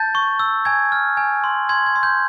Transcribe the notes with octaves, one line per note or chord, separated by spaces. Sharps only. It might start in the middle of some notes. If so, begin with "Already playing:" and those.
Already playing: A5 G6 A6
C#6
E6
G#5 G#6
F6
G#5
C6
C6 G#6
G#6
C6
G6